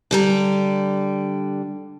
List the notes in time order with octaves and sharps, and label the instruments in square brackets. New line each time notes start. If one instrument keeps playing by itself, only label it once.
[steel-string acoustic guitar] D3 G3 A#5